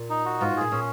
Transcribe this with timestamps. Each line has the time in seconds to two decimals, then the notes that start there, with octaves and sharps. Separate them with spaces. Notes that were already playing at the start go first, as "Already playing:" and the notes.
Already playing: A#2
0.10 D#4
0.26 F#4
0.41 G#2 F4
0.51 G#2
0.57 A#2 G#4
0.72 A#2 C#4